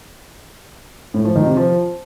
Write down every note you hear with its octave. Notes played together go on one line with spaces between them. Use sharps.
A2
F3
D#3
C3
F3